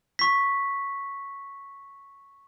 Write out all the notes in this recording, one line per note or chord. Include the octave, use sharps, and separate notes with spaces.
C#6 B6